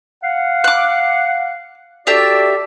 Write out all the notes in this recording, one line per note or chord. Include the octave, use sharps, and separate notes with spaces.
F5 F#5
D6 F#6
D4 F#4 G4 A4 D5 E5